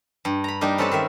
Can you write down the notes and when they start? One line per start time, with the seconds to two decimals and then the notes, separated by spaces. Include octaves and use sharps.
0.25 G2
0.44 A#5 B5
0.61 G3 A#3 D4 D#4 A#4
0.78 C4 C#4 A4 B4 D5 A5
0.91 D#3 G#3 E5